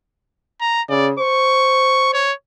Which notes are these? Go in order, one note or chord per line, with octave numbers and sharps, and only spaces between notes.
A#5
C#3 D5
C5 C#6
C#5